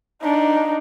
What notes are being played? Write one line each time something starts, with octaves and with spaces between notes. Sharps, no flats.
D4 D#4